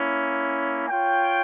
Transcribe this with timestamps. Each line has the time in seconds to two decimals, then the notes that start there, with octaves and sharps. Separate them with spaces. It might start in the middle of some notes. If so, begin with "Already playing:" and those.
Already playing: A#3 C#4 E4
0.88 F4 C#5 G5